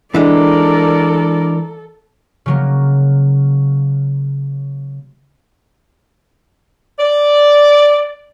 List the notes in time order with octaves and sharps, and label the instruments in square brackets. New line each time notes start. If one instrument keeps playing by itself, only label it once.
[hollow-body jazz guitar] E3 G#3 [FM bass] D4 [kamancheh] A4 [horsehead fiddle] A#4 D5
[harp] C#3 F#3 A#3
[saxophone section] D5